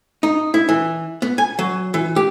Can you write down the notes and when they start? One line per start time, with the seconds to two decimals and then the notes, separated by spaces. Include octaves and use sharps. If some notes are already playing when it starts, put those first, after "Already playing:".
0.23 D#4
0.54 E4
0.69 E3
1.22 B3
1.38 G#5
1.59 F#3
1.94 E3
2.16 G4